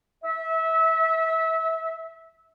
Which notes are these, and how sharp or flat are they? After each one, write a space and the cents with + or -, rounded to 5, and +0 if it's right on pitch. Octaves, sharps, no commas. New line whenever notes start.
E5 -25